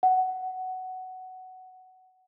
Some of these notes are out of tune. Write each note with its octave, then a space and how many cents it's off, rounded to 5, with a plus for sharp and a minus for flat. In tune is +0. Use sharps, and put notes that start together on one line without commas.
F#5 +10